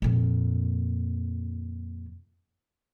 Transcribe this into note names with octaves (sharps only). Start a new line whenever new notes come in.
F2 A#2